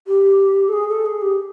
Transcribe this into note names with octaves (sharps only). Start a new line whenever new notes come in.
G4
A4
G#4
A4
G#4
G4